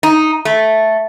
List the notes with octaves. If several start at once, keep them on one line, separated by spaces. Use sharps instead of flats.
D#4
A3